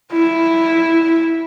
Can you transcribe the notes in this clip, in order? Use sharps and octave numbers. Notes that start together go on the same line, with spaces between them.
E4